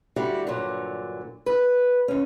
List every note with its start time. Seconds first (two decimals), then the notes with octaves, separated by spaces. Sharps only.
0.16 D3 G3 E4 F#4 G4
0.47 G2 A#2 D3 F#3
1.46 B4
2.08 D#2 C#4